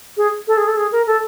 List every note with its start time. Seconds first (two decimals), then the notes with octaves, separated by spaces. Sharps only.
0.17 G#4
0.48 A4
0.57 G#4
0.68 A4
0.77 G#4
0.92 A#4
1.07 A4